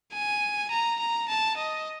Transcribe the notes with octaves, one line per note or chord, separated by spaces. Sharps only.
G#5
A#5
A#5
A5
D#5